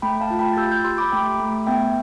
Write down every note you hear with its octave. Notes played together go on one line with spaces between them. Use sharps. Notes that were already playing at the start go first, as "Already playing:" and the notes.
A3 G5 B5
F5 A5
F4
G5 B5
A6
G4 E6 G6
E6 G6
G4 C6 E6
B5 D6
A3 G5 B5
A3
B3 E5 G5